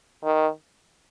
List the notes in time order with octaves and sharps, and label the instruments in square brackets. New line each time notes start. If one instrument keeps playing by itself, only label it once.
[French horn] D#3